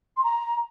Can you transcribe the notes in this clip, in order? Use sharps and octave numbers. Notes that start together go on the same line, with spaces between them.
C6
A#5